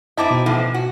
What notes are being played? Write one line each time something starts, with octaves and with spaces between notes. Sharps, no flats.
C4 D#4 E4 D#5 A5 D6
B2
A2 E3 F3
F#4